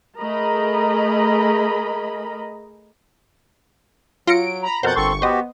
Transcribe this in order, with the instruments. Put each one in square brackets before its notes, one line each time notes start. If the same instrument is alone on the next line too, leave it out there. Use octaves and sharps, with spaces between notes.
[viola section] A3 G#4 A#4 D#5 A#5 B5
[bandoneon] F#3 [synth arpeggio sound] F4 A#6 C#7 [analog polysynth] D7
[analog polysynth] A#5 B5
[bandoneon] F2 B2 [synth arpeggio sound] A#4 C5 [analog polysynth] F#5 G6 A6
[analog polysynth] G1 C#6 [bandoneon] C4 A4 C6
[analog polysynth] B3 [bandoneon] F#4 G4 [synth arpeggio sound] C5 D#5